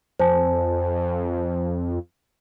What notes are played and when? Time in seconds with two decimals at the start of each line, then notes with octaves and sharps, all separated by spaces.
0.20 F2 C5 G#5 A5